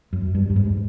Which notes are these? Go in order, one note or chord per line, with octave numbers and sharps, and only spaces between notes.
F#2
G2
G2
G#2